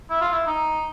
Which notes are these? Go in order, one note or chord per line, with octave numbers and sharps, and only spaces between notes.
E4
F4
E4
D#4